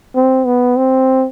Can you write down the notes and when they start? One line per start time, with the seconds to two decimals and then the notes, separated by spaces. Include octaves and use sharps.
0.15 C4
0.46 B3
0.77 C4